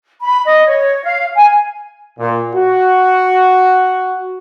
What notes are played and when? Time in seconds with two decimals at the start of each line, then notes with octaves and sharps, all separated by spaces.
0.21 B5
0.46 D#5
0.67 C#5
1.03 F5
1.35 G#5
2.19 A#2
2.54 F#4